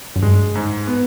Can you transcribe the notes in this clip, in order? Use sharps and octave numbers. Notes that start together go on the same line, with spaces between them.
F#2
G2 G#3
G#2
B3